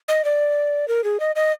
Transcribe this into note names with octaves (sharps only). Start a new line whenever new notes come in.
D#5
D5
A#4
G#4
D#5
D#5